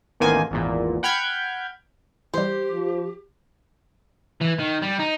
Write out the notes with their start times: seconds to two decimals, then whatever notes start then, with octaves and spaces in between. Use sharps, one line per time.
0.20 A1 E2 D#3 A#3 C5 G#5
0.51 G#1 E2 A#2
1.03 F#5 G5 B5 F6 G6 G#6
2.34 E3 G3 G4 C5
2.72 F3
4.41 E3
4.59 D#3
4.82 G3
4.99 D#4